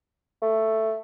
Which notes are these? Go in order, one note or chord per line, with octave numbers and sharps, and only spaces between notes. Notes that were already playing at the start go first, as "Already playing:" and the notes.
A3